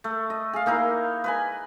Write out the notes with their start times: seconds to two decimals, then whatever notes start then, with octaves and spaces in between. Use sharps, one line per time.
0.04 A3
0.30 D#5
0.53 G#4 F5
0.66 A#3 D#4 E4 A#4
1.24 B4 D#5 G#5